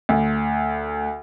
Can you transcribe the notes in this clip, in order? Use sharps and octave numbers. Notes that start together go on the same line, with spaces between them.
D2